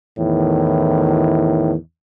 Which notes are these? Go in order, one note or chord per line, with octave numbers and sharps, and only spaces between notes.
E2 A2 D#3